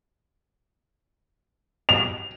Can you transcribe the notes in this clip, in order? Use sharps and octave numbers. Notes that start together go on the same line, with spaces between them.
F7